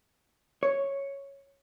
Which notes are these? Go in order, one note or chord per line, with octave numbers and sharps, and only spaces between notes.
C#5